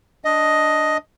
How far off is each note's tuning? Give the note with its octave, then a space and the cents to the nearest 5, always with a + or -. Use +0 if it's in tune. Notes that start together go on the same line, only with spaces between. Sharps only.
D4 +0 D#5 +5